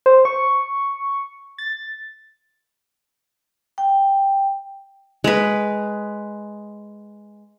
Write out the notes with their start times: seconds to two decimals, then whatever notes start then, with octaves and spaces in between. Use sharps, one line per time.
0.06 C5
0.25 C#6
1.58 A6
3.78 G5
5.24 G#3 B4